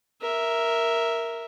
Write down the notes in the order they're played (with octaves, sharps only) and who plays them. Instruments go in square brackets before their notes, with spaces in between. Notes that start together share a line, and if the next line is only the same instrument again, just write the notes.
[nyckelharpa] A#4 E5